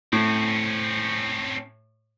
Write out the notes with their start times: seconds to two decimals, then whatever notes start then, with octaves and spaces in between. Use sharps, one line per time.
0.13 A2 C4 C#4